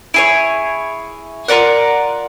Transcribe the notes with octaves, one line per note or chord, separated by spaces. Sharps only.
E4 G#4 C#5
F4 A#4 D5 F#5